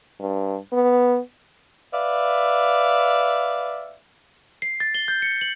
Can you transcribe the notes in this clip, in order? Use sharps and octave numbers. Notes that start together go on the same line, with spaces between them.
G2
B3
B4 D5 E5 F5
C7
A6
G7
G6
C#7
F#7